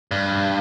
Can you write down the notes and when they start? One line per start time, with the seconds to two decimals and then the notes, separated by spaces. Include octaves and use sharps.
0.11 G2